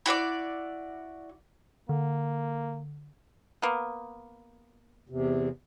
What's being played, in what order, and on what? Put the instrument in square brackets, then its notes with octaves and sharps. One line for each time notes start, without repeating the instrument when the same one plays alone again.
[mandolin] E4 F#4 C#5 D5
[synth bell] D3 [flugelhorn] A#3
[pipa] A#3 B3
[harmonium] E2 C3